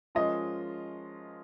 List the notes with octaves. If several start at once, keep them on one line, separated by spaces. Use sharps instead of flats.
F3 G#3 C#4 F4 A#4 D#5